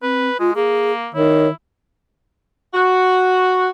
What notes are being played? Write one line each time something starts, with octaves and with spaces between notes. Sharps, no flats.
C4 B4
G#3 F4
A#3 G#4
D#3 E4 C#5
F#4